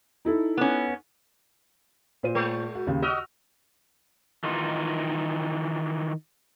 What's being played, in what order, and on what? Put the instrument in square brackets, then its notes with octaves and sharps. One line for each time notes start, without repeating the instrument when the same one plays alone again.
[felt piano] D#4 E4 A4
[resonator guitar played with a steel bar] B3 C#4
[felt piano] A#2 C5 D#7
[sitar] G#3
[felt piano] F#4
D#2 C#3
[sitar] F#4 D#5 [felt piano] E6 F6
[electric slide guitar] D#3 E3 D#4 F4